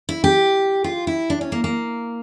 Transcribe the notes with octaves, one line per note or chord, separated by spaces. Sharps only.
E4
G4
F4
E4
D4
C#4
A#3
A#3